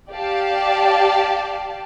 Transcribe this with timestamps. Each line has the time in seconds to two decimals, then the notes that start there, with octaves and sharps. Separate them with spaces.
0.11 G4 D5 F5 A5